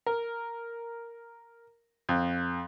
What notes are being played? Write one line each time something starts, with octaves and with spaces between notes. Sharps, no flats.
A#4
F2